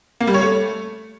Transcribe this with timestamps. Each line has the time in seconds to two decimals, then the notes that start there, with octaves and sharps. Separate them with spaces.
0.21 A#3
0.27 G3
0.34 C#5
0.41 A3